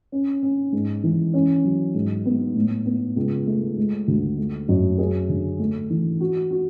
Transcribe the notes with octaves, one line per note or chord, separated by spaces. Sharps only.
C#4
C#4
G#2
E3
C#4
F#3
G#2
B3
A2
B3
C#2
A3
G#3
D2
A3
F#2
G#4
D3
A3
E3
F#4
F#4